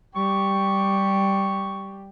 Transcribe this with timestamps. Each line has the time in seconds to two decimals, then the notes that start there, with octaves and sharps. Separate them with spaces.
0.15 G3 G4 C#6